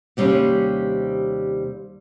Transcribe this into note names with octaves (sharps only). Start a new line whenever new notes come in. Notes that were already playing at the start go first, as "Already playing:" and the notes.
D#2 C3 G3 C4 C#4